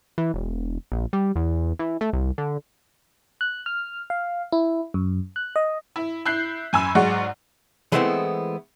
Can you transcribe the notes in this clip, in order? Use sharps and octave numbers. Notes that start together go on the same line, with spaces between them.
E3
E1
A#1
G3
E2
E3
A3
C2
D3
F#6
F6
F5
E4
F#2
F#6
D#5
E4
E4 F#6 G6 C7
F#2 G#5 B5 E6
G#2 F#3 G#3 D5 F#5 C#6
E3 G#3 A3 B3 C4 E4